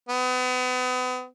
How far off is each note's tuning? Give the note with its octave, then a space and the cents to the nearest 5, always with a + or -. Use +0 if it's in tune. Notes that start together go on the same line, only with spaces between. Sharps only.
B3 +35